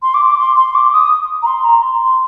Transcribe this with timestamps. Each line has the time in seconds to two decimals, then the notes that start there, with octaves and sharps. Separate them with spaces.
0.02 C6
0.14 D6
0.26 D6
0.38 C6
0.56 C6
0.75 D6
0.93 D#6
1.42 A#5
1.46 C6
1.64 A#5
1.82 C6